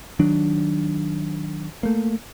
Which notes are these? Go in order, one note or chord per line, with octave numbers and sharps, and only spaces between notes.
D#3 F#3 D4
A3 A#3